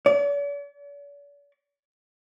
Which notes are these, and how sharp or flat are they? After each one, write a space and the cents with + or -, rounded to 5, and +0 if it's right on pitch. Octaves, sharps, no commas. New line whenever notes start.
D5 -45